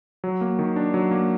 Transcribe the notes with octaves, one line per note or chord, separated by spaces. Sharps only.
F#3
A#3
D#3
D4
F#3
A#3